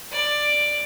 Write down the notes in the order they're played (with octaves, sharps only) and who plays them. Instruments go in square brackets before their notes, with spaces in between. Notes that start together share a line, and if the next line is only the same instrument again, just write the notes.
[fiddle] D5